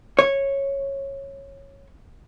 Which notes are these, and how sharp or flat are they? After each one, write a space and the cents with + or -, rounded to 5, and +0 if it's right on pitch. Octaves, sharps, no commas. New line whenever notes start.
C#5 -10